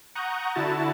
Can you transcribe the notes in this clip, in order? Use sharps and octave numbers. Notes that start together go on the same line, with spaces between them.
F#5 A#5 C#6 D#6 F#6 G6
D3 E4 F#4 A5 A6